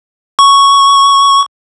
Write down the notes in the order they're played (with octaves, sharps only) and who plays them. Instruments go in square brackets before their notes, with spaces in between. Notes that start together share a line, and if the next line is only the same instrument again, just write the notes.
[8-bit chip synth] C#6